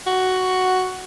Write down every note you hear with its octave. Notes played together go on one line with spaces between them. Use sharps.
F#4